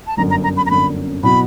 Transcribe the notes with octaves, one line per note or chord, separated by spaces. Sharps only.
A5
G1 F#2 D3 A#5
A#5
A#5
B5
A#5
G1 F#2 D3 B5
B2 F#3 B3 E4 B5